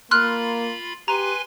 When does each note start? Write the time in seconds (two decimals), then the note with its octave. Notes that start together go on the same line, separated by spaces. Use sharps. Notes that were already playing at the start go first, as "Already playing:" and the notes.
0.11 A#3 F4 B5 C6 F6 F#6
1.08 G4 B4 G#5 A#5 C6